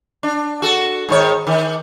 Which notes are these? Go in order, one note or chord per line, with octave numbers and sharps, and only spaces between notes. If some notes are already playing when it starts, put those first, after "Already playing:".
D4
F#4 A4
G#2 D#3 C#5
D#3